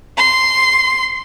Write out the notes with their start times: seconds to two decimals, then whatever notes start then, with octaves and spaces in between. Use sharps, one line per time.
0.17 C6